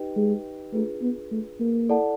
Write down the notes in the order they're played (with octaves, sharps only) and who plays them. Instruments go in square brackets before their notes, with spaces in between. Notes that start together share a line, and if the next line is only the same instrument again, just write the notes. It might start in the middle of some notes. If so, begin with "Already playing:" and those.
Already playing: [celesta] D#4 G4 B4 D#5 G5
[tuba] G#3
[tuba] A3 [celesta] D4 F4 G#4 B4
[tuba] B3
A3
A#3
[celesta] E4 A4 D5 F#5 A5